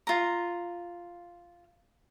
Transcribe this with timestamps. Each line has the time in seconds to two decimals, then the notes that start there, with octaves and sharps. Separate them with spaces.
0.07 F4 A#5